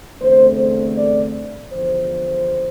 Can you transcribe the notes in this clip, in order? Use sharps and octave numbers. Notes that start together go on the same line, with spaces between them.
E2 D3 A3 C4 C5
C5
D5
E2 D3 F3 C5